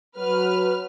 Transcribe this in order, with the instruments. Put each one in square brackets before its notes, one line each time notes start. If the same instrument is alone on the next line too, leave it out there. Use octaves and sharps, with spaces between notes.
[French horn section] F#3 [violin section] B4 F6